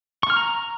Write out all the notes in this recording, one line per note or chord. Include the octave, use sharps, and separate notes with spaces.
C#6
F6
A#5